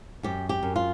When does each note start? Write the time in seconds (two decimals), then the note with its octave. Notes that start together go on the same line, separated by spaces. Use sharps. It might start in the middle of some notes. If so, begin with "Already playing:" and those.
0.23 F#2 G4
0.49 G4
0.63 F#2
0.76 F4